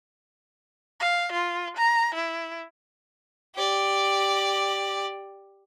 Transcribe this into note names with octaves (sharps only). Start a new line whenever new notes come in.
F5
F4
A#5
E4
G4 D5